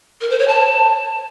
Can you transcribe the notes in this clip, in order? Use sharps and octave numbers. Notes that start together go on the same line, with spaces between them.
A#4
C5
C#5
A5